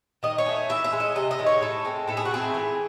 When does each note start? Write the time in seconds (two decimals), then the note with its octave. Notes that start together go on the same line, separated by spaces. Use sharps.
0.23 D#3 D#5
0.38 C#5
0.46 A3 C#4
0.69 E3 E5
0.84 E5
0.92 G#3 C#4
1.00 D#5
1.15 C3 D#5
1.31 D#5
1.38 D#3 G#3 C#4
1.46 C#5
1.61 A2 A4
1.85 G#3 C4
2.08 A2 A4
2.17 G#4
2.25 F#4
2.31 E3 A3 C4 G#4
2.54 E3